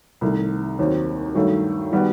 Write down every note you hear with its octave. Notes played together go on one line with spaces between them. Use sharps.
C2 C3 D#3 A3
D#2 D#3 F#3 C4
G2 D#3 F#3 A3
D#3 G3 B3 F#4